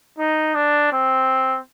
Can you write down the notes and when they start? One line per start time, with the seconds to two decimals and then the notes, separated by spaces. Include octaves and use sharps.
0.19 D#4
0.55 D4
0.92 C4